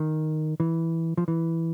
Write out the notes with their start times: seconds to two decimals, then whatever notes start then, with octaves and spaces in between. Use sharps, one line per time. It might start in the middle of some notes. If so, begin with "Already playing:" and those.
Already playing: D#3
0.60 E3
1.18 F3
1.28 E3